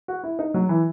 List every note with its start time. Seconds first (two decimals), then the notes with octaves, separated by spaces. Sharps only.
0.08 F#4
0.23 E4
0.39 D#4
0.54 F#3
0.69 E3